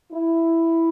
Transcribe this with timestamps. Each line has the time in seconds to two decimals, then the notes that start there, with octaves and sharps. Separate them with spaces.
0.12 E4